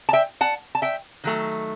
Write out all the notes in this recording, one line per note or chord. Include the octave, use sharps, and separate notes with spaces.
A5
E5 G5
F#5 A5
A5
E5 G5
D#3 F#3 A3